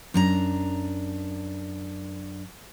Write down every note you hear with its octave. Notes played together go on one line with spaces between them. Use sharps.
F#2 D4 A#5